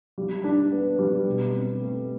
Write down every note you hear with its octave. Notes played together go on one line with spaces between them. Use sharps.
G3
D4
B3
G3
B2
C4
A3